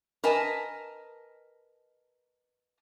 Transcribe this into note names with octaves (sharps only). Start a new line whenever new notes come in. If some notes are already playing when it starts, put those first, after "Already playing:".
A#4 B4 D#5 G#5 A5